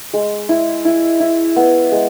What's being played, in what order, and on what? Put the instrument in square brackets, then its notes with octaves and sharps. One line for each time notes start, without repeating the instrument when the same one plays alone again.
[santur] G#3
E4
E4
E4
B3
G#3